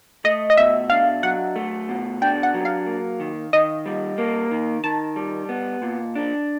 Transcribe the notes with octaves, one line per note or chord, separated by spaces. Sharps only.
A3 D#5
D#5
B2 E5
D4 F5
F#3 F#5
A3
B2
D4 G5
F#5
F#3
F5
A#3
D#3
D#3 D#5
G3
A#3
D#3
D#3 A5
G3
B3
A#2
D4